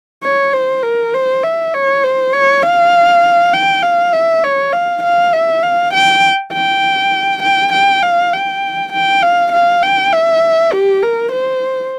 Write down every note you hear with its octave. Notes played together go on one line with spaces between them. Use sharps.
C#5
C5
A#4
C5
E5
C#5
C5
C#5
F5
G5
F5
E5
C#5
F5
F5
E5
F5
G5
G5
G5
G5
F5
G5
G5
F5
F5
G5
E5
G4
A#4
C5